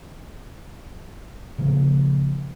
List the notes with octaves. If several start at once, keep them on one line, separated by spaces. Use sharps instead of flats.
A#2 C#3 F3 A#3